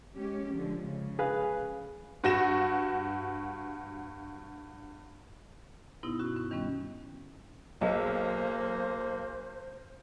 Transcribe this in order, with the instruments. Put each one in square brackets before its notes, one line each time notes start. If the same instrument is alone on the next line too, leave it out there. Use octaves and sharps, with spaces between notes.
[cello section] G#3 C#4 G4
D3 F3 G#3
C#3
[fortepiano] G#4 B4 F5
[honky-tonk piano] G2 F#4 A#6 E7
[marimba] G2 B2 B3 D#4 E4
C#4 F#4
C#4
D#3 G3 B3 C#4
[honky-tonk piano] B1 [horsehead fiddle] A#3 [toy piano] F#4 G#4 D#5 [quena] C5